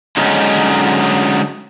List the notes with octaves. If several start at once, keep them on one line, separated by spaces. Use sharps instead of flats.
D3 F#3 G#3 C#4 D#4